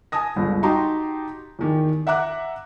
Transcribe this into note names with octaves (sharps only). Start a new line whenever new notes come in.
G#5 A5 D#6 A#6
G1 C#2
D#4 F#4 G4 A5 A#5 C6
E2 D#3 G4
E5 F#5 A#5 D6 F#6